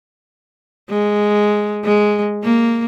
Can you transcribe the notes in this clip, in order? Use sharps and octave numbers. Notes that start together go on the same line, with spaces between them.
G#3
G#3
A#3